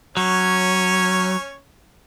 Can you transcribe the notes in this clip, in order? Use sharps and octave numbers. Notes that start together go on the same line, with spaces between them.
F#3 C#4 C#5